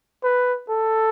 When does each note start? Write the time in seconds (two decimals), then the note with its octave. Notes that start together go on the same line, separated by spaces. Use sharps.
0.24 B4
0.69 A4